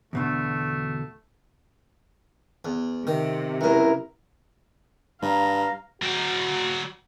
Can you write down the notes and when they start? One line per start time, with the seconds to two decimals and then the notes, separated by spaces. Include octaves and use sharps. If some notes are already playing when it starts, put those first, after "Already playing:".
0.13 E2 B2 D3 A3
2.65 E2
3.07 C3 D#3
3.61 C#2 F#2 E4 A#4
5.22 G2 F5 A#5
6.02 F#3 F#4 G5